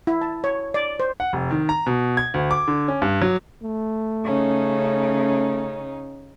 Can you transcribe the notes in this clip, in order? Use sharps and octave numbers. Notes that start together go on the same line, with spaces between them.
E4
A5
C#5
D5
C5
F#5
F1
D#3
A#5
B2
G#6
D2
D6
D3
C#4
G2
F#3
A3
C#3 C#4 D#4